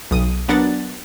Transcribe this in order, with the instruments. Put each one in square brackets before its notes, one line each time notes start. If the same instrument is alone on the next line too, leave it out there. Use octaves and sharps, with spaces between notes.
[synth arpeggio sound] B1 D#6
F#3 B3 D4 A#4 F#5 A6